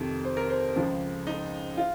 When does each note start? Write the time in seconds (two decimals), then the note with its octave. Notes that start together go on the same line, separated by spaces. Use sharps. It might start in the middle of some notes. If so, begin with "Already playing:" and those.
Already playing: F2 C3 D#3
0.25 C5
0.37 A#4
0.50 C5
0.76 C#2 C#3 F3
1.27 D#4
1.77 F4